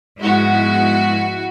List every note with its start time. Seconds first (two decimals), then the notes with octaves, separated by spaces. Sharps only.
0.22 G#2 F3 G#3 B3 E4 F#4